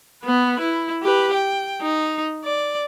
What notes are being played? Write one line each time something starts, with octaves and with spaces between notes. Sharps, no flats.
B3 B4
E4
G4 B4
G5
D#4
D5